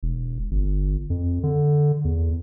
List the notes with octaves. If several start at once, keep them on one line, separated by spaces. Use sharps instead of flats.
E1
G1
F2
D3
E2